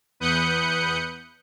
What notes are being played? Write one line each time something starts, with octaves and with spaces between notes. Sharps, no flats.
E2 B4 D#6 F#6 G6 C#7